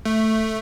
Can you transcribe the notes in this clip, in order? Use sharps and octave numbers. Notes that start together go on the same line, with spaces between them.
A3